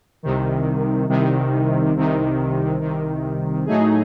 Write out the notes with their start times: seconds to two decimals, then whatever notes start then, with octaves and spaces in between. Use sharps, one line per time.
0.23 C2 C3 D#3
1.09 C2 C3 D#3
1.95 C2 C3 D#3
2.80 C2 C3 D#3
3.66 A2 F#3 A3 D#4 G#4